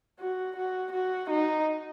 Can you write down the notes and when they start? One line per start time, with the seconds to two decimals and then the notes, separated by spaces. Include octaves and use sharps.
0.19 F#4
0.56 F#4
0.93 F#4
1.30 D#4